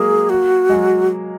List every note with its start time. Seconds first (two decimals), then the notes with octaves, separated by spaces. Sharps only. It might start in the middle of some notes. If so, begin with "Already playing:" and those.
Already playing: F#3 G#3 A#3 G#4
0.29 F#4
0.69 G#3
0.74 F#3